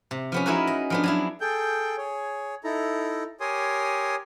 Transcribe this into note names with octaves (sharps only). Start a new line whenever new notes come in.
C3
F3 B3 C#4
D#4 E4 F#4 G#4 A#4 B4
D#5
F3 B3 D4
F#3 D4 E4
G#4 A4 G5 G6
G#4 C#5
D#4 E4 A4 A#5
G4 A#4 C#5 G#5 C6 D#6